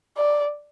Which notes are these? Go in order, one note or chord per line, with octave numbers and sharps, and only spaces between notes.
D5